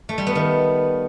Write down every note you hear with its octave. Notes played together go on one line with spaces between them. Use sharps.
A3
G3
B3
D#3